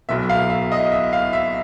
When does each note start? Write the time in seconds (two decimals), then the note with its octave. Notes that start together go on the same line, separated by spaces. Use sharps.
0.09 B1 B2 E5
0.29 F5
0.50 E5
0.72 D#5
0.92 E5
1.13 F5
1.33 E5